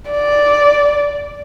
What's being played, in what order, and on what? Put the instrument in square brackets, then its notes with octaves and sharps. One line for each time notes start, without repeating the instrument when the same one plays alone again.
[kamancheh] D5